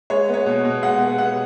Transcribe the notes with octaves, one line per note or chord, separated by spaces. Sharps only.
G#3 C#5
B3
C#5
B2
B2
G#3 F#5
B3
B2 F#5